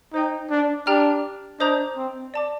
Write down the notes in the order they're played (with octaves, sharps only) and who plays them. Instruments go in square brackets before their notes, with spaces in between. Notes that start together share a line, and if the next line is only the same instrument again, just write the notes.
[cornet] D#4 [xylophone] C5 D#5 G5
[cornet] D4
[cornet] D4 [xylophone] G4 D5 G5 A#5 F6
[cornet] D4 [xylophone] C5 D#5 A#5 D#6 G6
[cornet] C4
[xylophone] D5 A5 D6